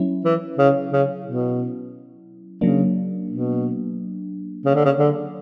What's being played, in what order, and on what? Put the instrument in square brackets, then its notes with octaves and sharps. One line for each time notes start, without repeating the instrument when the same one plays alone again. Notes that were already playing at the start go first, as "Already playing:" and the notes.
Already playing: [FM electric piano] F#3 C#4 E4
[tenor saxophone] E3
C#3
C#3
B2
[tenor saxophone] C#3 [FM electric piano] F#3 A#3 D4
[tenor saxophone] B2
C#3
D3
C#3
D3